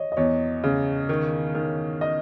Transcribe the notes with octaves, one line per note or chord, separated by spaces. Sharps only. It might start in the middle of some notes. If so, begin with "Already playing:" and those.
Already playing: C#5 D#5
D#5
E2 C#5
C#3
D#3
D#3
D#5